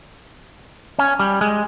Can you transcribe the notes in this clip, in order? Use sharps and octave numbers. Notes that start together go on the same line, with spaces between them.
C#4
G3
G#3